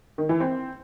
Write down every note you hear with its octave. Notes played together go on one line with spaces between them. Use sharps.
D#3
E3
C4